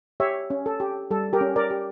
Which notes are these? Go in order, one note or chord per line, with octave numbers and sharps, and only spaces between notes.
G4 C#5 E5
C#4
A4
G4
G3 A4
G4 A#4
C#4
A#4 D5
G4